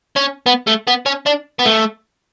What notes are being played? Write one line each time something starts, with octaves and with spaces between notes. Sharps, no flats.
C#4
B3
A3
B3
C#4
D4
B3
A3